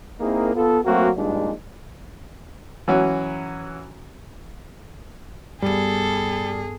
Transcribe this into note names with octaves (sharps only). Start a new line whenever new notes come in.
A#3 C4 D#4 E4 G#4 A#4
B3 F4 A4
F#3 A3 A#3 C4 F#4
A#1 G2 A#2 G#3 D4 D#4
E3 F#3 C#4 F#4
G2 G3 B3 G#4 A4